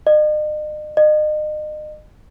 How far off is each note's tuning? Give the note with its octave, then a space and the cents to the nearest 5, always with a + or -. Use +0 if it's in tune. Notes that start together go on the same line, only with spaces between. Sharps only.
D#5 -40
D#5 -35